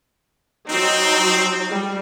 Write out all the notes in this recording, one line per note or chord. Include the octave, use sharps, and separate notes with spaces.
F#3 C4 D#4
G3